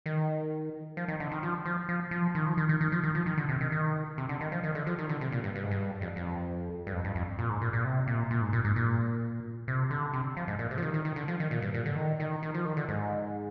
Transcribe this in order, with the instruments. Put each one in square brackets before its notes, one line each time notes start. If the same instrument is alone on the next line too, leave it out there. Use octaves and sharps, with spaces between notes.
[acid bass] D#3
F3
D#3
D3
D#3
F3
F3
F3
F3
D#3
F3
D#3
D#3
D#3
F3
D#3
F3
D#3
D3
C3
D#3
D#3
C3
D3
D#3
F3
D#3
D3
F3
D#3
D3
C3
A#2
G2
G2
G#2
G2
F2
F2
G2
F2
G2
F2
A#2
G#2
A#2
A#2
C3
A#2
A#2
G#2
A#2
G#2
A#2
C3
D3
C3
F3
G#2
A#2
C3
F3
D#3
D#3
D#3
D3
F3
D#3
A#2
G2
A#2
D3
D#3
D#3
D#3
F3
D#3
D3
G#2